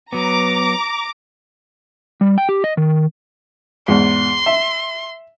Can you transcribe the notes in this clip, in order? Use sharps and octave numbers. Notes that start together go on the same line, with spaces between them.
F#3 B3 A#5 D6
G3
G5
G4
D#5
D#3
E2 G#2 C6
E5